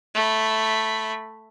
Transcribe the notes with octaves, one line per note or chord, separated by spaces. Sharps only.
A3 B5